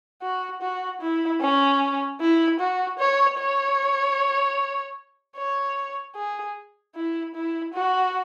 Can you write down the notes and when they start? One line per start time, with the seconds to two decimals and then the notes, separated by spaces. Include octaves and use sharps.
0.22 F#4
0.62 F#4
1.01 E4
1.41 C#4
2.20 E4
2.60 F#4
2.99 C#5
3.39 C#5
5.37 C#5
6.15 G#4
6.95 E4
7.34 E4
7.74 F#4